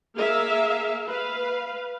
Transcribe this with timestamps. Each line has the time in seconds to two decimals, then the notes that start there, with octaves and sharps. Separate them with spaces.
0.16 A#3 G#4 A#4 E5 F5
1.07 B4 F5